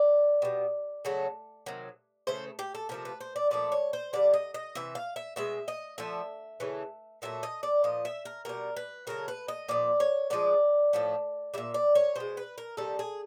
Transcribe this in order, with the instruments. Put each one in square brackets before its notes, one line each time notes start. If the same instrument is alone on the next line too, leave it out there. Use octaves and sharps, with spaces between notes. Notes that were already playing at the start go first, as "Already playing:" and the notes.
Already playing: [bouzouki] D5
B2 G3
C#3 F#3 A3
C3 D#3 F#3
C#3 E3 A3 C5
G4
A4
C3 F3 A3 A#4
B4
C5
D5
A#2 F3 A3 D5
C#5
C5
D3 G3 D5
D#5
D#5
C3 E3 E5
F5
E5
B2 G#3 E5
D#5
D3 F3 A3 E5
C#3 E3 A3
A#2 F#3 A3 E5
D#5
D5
A#2 F3 D#5
E5
A#4
B2 G3 A#4
B4
C#3 F#3 A3 A#4
B4
D#5
A#2 F3 D5
C#5
D3 F3 G#3 D5
A2 F3 A3
A#2 G3 E5
D5
C#5
B2 G#3 C5
B4
A#4
C3 D#3 G3 A4
G#4